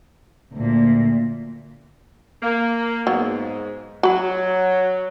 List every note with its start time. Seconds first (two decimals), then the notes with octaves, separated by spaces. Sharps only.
0.53 D2 A#2
2.42 A#3
3.07 G#2 F#3 A#3 B3
4.03 F#3 F#4 B5